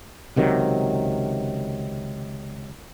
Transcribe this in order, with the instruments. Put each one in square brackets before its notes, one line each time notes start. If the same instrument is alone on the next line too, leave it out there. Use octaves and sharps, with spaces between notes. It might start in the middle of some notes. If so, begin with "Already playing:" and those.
[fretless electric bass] C#2 C3 D#3 F#3